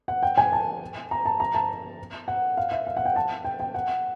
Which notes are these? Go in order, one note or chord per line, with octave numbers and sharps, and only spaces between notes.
F#5
G5
G#5
A5
A#5
A5
A#5
A5
F#5
F5
E5
F5
F#5
G5
A5
G5
G5
F#5